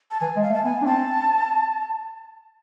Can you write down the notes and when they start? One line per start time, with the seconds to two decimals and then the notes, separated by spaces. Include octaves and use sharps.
0.11 A5
0.21 E3 G#5
0.36 G#3
0.43 F5
0.50 A3
0.54 A5
0.64 B3 G#5
0.82 D4
0.86 C4 A5